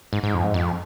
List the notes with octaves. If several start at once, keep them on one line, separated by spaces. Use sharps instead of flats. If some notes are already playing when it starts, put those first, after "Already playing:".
G#2
G#2
F2
G#2
F2